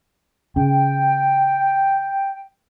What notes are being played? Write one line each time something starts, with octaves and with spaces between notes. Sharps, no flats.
C#3 G5